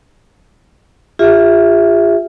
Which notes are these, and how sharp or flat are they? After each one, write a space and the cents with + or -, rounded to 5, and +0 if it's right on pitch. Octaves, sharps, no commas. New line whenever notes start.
F4 +0 G#4 -45 E5 +0